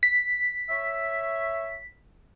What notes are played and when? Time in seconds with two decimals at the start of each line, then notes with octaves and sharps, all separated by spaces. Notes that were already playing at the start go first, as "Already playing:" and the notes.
0.03 B6
0.70 C#5 E5